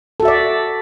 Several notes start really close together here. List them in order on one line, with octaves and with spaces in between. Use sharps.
A4 F#4 E5 D5